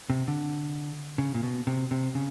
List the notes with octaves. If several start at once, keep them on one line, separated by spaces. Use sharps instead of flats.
C3
D3
C#3
A#2
B2
C3
C3
C#3